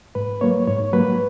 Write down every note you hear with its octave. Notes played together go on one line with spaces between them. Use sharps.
G#2 B4
F#3 A#3 C#5
G#2 C#5
F#3 A#3 B4